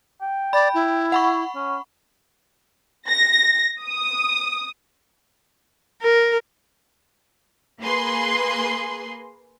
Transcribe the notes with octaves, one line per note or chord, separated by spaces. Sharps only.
G5
D5 B5
E4
F#5 B5 C#6
C#4
A#6
D#6
A#4
A#3 G#4 B4 C6